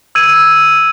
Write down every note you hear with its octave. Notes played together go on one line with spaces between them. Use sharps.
E6 G#6 D#7